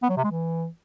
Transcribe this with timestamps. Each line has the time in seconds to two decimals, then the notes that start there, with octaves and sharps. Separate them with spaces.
0.03 B3
0.10 F#3
0.17 C3
0.24 G#3
0.31 E3